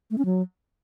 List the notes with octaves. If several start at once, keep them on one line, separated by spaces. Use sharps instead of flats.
A3
C#4
F#3